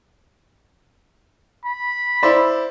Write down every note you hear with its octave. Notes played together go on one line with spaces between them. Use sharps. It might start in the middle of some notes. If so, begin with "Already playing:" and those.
B5
E4 C5 D5